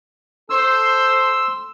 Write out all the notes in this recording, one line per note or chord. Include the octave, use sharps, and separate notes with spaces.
A4 C5 C6 E6